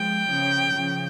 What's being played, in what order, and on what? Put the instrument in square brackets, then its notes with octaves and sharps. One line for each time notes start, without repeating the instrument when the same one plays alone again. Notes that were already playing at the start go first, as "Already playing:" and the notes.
Already playing: [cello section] F3 G#3 [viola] G5
[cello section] C#3 F3
C#3 F3